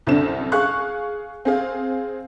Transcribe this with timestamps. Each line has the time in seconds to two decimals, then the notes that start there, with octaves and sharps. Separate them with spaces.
0.07 C2 F#2 D3 C4 D4 E7
0.52 G#4 F5 C#6 F#6
1.45 C4 G#4 F5